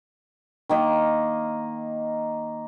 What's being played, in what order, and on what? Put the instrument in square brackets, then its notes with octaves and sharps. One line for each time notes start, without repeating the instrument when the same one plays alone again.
[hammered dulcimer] D#3 A#3 D#5